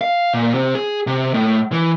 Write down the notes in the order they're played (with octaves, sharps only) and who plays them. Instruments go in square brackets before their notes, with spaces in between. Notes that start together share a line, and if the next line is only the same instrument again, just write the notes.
[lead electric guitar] F5
A#2
C3
G#4
C3
A2
E3